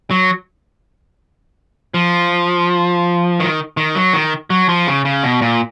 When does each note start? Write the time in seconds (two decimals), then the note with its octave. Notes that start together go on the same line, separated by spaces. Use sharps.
0.11 F#3
1.94 F3
3.40 D#3
3.77 D#3
3.95 F#3
4.13 D#3
4.50 F#3
4.69 F3
4.87 C#3
5.05 C#3
5.23 B2
5.42 A#2